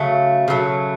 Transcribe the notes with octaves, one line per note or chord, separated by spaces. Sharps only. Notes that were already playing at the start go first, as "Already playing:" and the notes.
Already playing: C#3 F#3 A3
C#3 F#3 A3